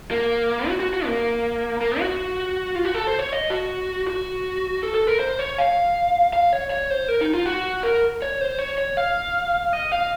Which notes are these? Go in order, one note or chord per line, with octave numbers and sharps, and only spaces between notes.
A#3
F#4
F#4
F#4
A#3
A#3
F#4
F4
F#4
A4
C5
C#5
D#5
F#4
F#4
A4
A4
A#4
C5
C#5
F5
F5
C#5
C#5
C5
A#4
D#4
F4
F#4
A#4
C#5
C5
C#5
C#5
F5
D#5
F5